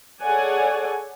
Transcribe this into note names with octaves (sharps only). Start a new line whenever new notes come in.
G#4 A4 C#5 D5 F#5 G#5